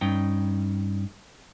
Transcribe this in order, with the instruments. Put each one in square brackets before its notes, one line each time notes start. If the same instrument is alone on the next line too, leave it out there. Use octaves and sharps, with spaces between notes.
[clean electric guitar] G2 C#4 D#4 G5